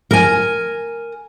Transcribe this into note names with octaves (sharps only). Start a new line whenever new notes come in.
A#4 G#5